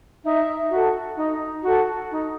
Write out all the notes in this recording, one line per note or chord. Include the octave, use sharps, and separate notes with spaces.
D#4 E5
F#4 A4
D#4
F#4 A4
D#4